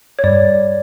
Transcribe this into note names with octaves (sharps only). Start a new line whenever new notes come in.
C#5
G2 D5